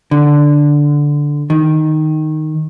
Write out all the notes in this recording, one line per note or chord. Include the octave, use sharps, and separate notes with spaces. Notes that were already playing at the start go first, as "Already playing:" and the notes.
D3
D#3